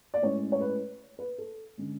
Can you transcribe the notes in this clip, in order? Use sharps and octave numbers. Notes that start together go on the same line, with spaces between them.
D5
A2 G#3 C#4 C#5
C#5
B4
B4
A4
D3 G#3 C#4